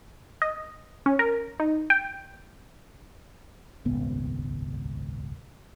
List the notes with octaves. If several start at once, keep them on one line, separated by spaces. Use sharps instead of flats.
D#5
C#4
A#4
D#4
G5
D#1 G#1 C#2 B3